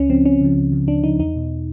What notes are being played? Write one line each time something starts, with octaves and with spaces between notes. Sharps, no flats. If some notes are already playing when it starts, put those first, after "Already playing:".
Already playing: C#2 C#4
C#3 F3 C4
C#2 C#4
C#3 F3
C#2
C#3 F3
C#2 D4
C#3 F3 D#4
E2 D#4
B2